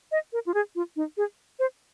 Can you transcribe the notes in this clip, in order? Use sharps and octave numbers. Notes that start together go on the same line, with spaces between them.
D#5
A#4
F4
G#4
F4
D#4
G#4
C5